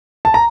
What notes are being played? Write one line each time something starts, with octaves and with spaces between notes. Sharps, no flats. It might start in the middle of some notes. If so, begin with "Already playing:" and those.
A5
A#5